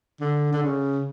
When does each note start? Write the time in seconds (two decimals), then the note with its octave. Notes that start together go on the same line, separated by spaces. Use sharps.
0.20 D3
0.53 D3
0.63 C#3